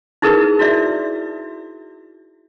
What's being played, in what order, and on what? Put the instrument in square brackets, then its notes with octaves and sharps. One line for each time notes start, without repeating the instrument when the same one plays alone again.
[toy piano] D#4 E4 G#4 A#4 B4
E4 F#4 D5 E5